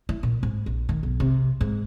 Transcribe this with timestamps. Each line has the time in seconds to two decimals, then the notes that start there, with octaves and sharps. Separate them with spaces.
0.09 E4
0.23 A#2
0.43 G#2
0.66 A#1
0.89 D#3
1.03 B1
1.20 C3
1.61 G#2